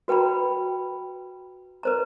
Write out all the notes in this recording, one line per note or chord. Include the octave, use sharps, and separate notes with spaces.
F#4 B4 G5 A#5 B5
B4 C5 A#5